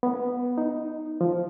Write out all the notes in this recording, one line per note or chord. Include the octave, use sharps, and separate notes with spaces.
B3
D#4
F3